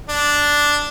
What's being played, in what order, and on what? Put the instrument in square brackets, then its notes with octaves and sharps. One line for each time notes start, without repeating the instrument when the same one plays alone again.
[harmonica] D4